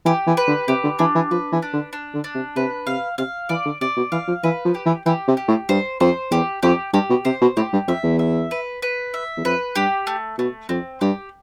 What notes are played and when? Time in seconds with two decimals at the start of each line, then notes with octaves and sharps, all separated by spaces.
0.05 E3 G4
0.27 E3
0.37 B4
0.47 D3
0.68 C3 G4
0.84 D3
0.99 E3 D4
1.15 E3
1.31 F3 B4
1.52 E3
1.62 D4
1.73 D3
1.93 D4
2.14 D3
2.24 D4
2.35 C3
2.56 C3 B4
2.87 C3 F5
3.18 C3 F5
3.49 E3 D5
3.65 D3
3.81 C3 D5
3.97 B2
4.12 E3 F5
4.28 F3
4.43 E3 B4
4.65 F3
4.75 G4
4.85 E3
5.06 E3 G4
5.28 C3
5.37 G4
5.48 A2
5.69 G2 C5
6.00 F2 C5
6.31 E2 G4
6.63 F2 G4
6.93 G2 G4
7.10 B2
7.25 C3 C5
7.41 B2
7.57 A2 G4
7.73 G2
7.87 F2 E5
8.03 E2
8.19 E5
8.51 B4
8.82 B4
9.14 E5
9.37 E2
9.45 F2 B4
9.76 G2 G4
10.07 A3
10.38 B2 A3
10.69 F2 C4
11.01 G2 G4